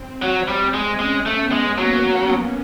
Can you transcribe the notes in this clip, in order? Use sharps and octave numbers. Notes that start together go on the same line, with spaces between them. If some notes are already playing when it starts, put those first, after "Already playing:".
Already playing: C4
F#3
G3
G#3
G#3 C#4
A3
B3
G#3
F#3 A#3